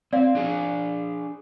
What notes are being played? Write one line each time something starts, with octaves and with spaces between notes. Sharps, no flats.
C4 D5 F5
D4 G#4